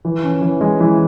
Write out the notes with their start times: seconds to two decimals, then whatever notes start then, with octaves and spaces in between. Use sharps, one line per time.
0.05 E3
0.24 C#4
0.41 E3
0.61 G#3
0.80 E3